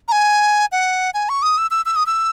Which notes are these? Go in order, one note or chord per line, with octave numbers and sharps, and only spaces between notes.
A#5
G#5
F#5
G#5
C#6
D#6
E6
E6
E6
D#6
E6